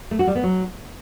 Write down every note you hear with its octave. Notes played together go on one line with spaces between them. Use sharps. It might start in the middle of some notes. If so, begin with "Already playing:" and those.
A3
F#4
G3
B3
F#3